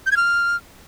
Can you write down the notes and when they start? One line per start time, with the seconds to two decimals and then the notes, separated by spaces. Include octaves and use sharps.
0.06 G6
0.12 G#6
0.17 F6